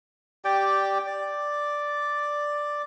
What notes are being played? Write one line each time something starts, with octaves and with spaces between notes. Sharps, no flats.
G4 D5 G5
D5